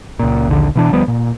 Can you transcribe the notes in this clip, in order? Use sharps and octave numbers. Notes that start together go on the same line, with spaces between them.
C#2 A#2
A#1 D#2 D3
B2 E3 D4
D2 F3 G3 B3
A#2